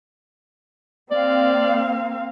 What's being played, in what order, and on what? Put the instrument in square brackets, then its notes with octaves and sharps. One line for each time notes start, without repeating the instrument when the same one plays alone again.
[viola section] A#3 C4 F5 [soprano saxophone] D5